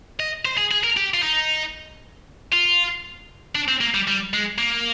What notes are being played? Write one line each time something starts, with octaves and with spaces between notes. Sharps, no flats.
D#5
C5
G#4
G#4
A#4
G4
F4
D#4
F4
D4
C4
A#3
G3
G3
G#3
A#3